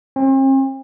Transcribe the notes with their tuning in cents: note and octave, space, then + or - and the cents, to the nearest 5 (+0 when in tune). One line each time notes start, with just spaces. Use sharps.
C4 +45